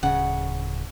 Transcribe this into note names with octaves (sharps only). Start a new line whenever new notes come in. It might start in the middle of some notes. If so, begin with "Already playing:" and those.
D1 C#3 F#5